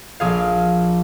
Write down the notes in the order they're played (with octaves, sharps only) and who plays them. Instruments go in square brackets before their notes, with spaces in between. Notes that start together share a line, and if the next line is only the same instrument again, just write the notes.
[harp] A#1 G#4 F5